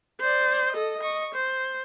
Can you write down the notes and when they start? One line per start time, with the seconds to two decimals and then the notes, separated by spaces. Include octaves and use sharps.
0.20 C5 D5
0.72 A4 D#5
1.01 D#5 C#6
1.34 C5